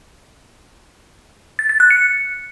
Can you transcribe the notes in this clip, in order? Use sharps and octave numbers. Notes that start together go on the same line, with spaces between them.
A6
A6
F#6
C#7